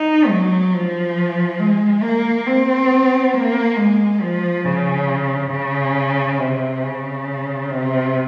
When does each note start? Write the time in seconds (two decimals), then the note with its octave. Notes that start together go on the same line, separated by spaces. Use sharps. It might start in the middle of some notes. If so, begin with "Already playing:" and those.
Already playing: D#4
0.29 F#3
0.73 F3
1.59 G#3
2.03 A#3
2.46 C4
3.33 A#3
3.77 G#3
4.21 F3
4.65 C#3
5.51 C#3
6.39 C3
6.83 C#3
7.70 C3